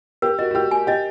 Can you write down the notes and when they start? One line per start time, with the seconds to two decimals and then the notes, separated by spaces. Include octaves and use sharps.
0.22 G4 A#4
0.38 F#4 D#5
0.51 F#4
0.55 G4 A#4
0.71 G#5
0.87 G4 D#5